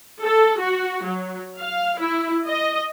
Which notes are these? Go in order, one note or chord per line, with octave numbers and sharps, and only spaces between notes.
A4
F#4
F#3
F5
E4
D#5